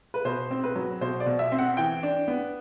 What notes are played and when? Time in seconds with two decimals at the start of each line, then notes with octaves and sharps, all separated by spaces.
0.14 B4
0.25 B2 C5
0.51 C4
0.64 B4
0.76 F#3
1.01 B2 C5
1.20 D5
1.26 B2
1.39 E5
1.52 C4
1.59 F#5
1.77 E3 G5
2.03 D4
2.28 B3